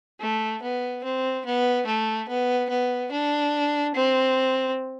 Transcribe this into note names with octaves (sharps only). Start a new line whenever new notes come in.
A3
B3
C4
B3
A3
B3
B3
D4
C4